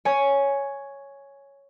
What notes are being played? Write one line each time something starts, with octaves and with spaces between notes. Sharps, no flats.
C#5 G#5